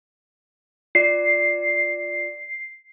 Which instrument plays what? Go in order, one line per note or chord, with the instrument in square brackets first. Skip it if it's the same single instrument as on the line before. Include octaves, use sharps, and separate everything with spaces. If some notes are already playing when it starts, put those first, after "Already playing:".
[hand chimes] F4 D5 [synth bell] C7